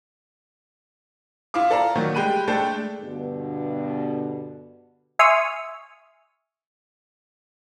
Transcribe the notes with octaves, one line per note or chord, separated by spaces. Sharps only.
E4 F4 F5 D6
A4 D5 F5 A#5
D#3 F#3 A3 F#4
G3 G#3 G5 B5 F#6 D#7
G#3 A3 D4 A4 G5
G2 B2 D3
E5 G#5 C6 C#6 D#6 F6